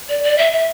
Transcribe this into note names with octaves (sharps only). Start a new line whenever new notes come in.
D5
D5
E5
E5